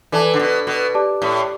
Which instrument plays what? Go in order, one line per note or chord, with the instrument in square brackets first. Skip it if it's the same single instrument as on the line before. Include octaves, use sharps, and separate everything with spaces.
[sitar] E3 [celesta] A4 D5 A5 D6
[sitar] D3
B2
B2
[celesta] G4 D5 A5 D6
[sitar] A2